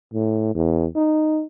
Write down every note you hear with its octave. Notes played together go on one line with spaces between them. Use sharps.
A2
E2
D#4